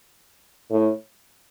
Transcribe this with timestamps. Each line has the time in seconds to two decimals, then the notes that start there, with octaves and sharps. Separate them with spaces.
0.71 A2